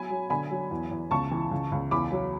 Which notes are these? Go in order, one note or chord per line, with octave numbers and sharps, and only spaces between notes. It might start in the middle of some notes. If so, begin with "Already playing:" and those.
Already playing: F#3 G#5 B5
F#3
D3 G#5 B5
F#3
E2
E2
C#2 A5 C#6
E3
C#2
C#2
E2 B5 D6
F#3